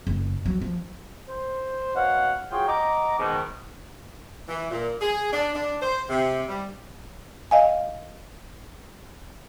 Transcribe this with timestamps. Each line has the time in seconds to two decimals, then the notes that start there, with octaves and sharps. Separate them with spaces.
0.07 F#1
0.46 F#3
0.61 F3
1.29 C5
1.95 B2 C#5 F5 F#5
2.51 F4 F#4 G#4 C#5 G5
2.68 D#5 F#5 A#5 D6
3.19 G#2 B2 D#3
4.49 E3
4.71 A#2
5.01 G#4
5.32 D4
5.54 D4
5.81 C5
6.09 C3
6.49 G3
7.51 D#5 F5 G#5